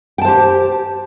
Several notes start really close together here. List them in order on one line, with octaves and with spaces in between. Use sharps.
G5 A5 C5 G4